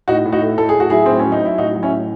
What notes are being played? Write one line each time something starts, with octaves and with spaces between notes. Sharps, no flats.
A2 D#4 F#4
A2
D#4 F#4
A3
A2 A4
G#4
A2 F#4
F#3 E4 G#4
A2 C4
F#3 C#4
D#4
F#3 E4
A2 D#4 F#4
F#3
C#4 E4
A2